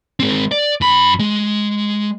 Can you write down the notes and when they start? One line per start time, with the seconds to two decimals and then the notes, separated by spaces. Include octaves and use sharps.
0.20 G#3 C4
0.51 D5
0.81 F#2 B5
1.19 G#3